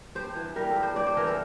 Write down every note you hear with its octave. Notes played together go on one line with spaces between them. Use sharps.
G2 C5
E3
G3 A#4
A4
G2
C5
G2 D5
C5
E3 A#4
A4